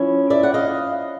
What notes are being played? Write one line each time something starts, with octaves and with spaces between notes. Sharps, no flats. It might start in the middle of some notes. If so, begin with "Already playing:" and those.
Already playing: F3 C#4 E4
D5 E5
F#5
D#5 F5